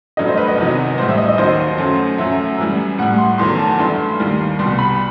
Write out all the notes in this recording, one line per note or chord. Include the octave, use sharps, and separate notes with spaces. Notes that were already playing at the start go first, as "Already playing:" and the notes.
G2 F#3 A3 D#5
C5
B4
D#5
E2 C3 D#3 F#3
A2 E3 G3 C5
E5
D#5
D#5
D#2 D#3 F#3 C5
F#2 F#3 A3
F#2 F#3 A3 E5
F#2 E3 G3
A2 G3 F#5
C6
E2 D#3 F#3 A3 C6
A5
G2 E3 A3 C6
D#2 D#3 G3
C2 B2 G3 C6
B5